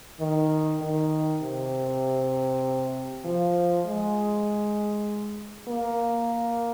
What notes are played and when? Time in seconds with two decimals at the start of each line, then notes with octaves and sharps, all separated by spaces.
0.20 D#3
0.81 D#3
1.42 C3
3.24 F3
3.86 G#3
5.68 A#3